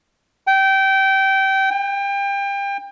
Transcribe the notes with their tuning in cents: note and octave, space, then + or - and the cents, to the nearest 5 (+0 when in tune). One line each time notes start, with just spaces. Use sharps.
G5 -20
G5 +30